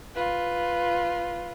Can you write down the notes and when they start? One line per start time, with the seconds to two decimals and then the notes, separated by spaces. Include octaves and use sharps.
0.15 F4 B4